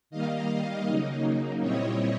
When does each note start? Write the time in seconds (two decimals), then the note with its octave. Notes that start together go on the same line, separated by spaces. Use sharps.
0.10 D#3 G3 A#3 D#5 F5
0.86 C#3 F#3 A#3 D#4
1.61 A#2 G3 C4 E4 C#5 D#5